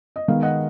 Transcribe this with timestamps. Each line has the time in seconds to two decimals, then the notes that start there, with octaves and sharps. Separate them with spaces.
0.16 D#5
0.28 D#3 G#3 B3 F5
0.42 D#5 F#5